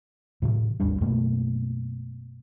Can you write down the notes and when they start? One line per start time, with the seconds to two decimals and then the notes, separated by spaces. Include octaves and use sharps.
0.42 A2 C3 E3
0.80 G#1 D#2 G3 D4
1.01 F#2 B2 A3 A#3